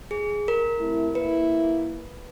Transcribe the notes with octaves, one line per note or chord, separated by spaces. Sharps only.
G#4
A#4
C3 A3 E4
A#3 E4 B4